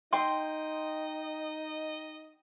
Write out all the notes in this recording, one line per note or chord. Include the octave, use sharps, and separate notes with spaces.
D#4 D#5 G5 C6